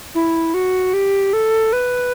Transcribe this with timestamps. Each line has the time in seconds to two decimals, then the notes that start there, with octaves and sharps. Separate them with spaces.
0.15 E4
0.54 F#4
0.94 G4
1.33 A4
1.73 B4